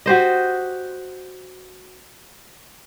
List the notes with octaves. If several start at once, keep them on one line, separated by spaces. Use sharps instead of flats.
F#4 G4 C5 D#5